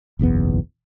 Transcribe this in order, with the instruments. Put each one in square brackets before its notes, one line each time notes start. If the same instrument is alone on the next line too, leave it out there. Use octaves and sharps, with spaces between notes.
[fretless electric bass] F#1 B1 E2 B3